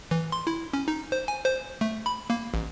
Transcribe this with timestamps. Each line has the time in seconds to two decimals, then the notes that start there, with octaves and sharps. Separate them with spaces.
0.11 E3
0.32 C6
0.47 E4
0.73 C#4
0.88 D#4
1.12 C5
1.28 G#5
1.45 C5
1.81 A3
2.06 B5
2.30 A#3
2.54 A1